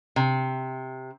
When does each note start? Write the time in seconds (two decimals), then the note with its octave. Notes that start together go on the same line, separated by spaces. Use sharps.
0.16 C3